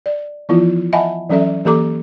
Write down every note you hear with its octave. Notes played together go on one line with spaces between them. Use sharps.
D5
E3 F3 B3 E4 F4
D#5 E5 F#5 G#5 A5 B5
E3 F#3 C#4 A4 D5 E5
E3 A#3 G4 A4 A#5 D6